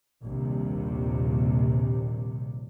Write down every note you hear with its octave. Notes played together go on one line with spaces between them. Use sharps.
A#1 D#2 C3 G3